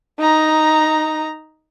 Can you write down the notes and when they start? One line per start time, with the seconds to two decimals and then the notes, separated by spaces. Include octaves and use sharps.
0.20 D#4 A#5